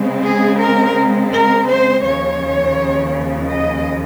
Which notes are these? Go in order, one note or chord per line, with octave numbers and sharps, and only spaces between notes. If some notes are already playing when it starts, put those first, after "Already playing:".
Already playing: C#3 G#3 C4
G#4
A#4
A#4
C5
D#2 C#3 F3 C#5
D#5